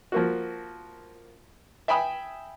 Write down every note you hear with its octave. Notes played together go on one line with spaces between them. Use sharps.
F3 A#3 F#4
E5 G5 G#5 B5 D#6